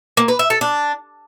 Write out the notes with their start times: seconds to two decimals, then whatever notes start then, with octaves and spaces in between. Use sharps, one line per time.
0.17 A#3
0.28 B4
0.39 E5
0.50 A4
0.61 D4